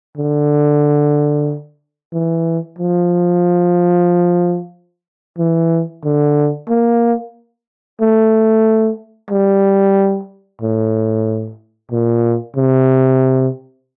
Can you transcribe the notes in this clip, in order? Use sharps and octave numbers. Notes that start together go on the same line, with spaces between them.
D3
E3
F3
E3
D3
A#3
A3
G3
A2
A#2
C3